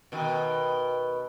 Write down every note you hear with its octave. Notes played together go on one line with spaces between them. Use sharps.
B2 D#3